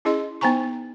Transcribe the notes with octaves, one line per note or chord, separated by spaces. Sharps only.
C#4 E4 G#4 D#5 C6
B3 D#4 C5 G#5 A#5 C#6